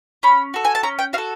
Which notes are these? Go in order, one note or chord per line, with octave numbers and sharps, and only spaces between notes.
C#4 B5
F#4 A4
G#5
A5
C#4 A#5
G5
F#4 A4 F5